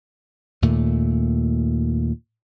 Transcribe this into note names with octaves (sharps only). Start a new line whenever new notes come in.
D#2 A#2 A3